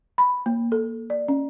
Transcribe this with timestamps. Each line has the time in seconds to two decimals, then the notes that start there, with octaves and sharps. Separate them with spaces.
0.18 B5
0.46 A#3
0.72 A4
1.10 D5
1.28 C#4